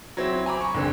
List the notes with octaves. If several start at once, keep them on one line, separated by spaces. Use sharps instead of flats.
F#3 C4 E4
G#5 A#5 B5 D6
C#6
F#1 D3 C4